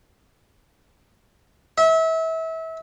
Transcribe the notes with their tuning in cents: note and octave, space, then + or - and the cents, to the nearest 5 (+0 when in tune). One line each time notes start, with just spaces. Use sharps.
E5 -30